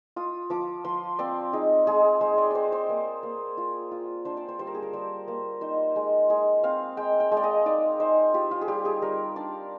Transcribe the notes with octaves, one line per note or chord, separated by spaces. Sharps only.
F4 D#6
F3 D6
F3 C6
C4 D5
D#4 G#4
G#3 G#4
G#3 C5
D5
C4 C5 D5
C5
A#3
A#3
F4
F4
D4 C5
D5
C5
G3 C5
A#4
G#4
A#4
G3 C5
A#3
D#4 C5
G#3
G#3 G#4
C4 F5
G#3 G5
G5
G#3
D5
D#5
D#4 D5
D#4 C5
F4 G4
F4
G#4
G3 G4
G#4
G3 A#4
D4 D5